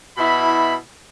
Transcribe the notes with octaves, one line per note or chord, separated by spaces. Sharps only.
B2 E4 B5